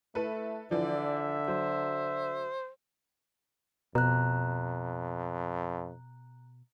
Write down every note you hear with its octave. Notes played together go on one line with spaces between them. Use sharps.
A3 E4 A4 B4
D3 E3 F3 D5 E5
F#3 C5
F2 B2 A#5 F#6